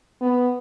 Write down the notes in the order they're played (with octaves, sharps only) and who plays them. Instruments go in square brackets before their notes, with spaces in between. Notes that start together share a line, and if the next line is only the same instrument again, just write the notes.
[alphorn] B3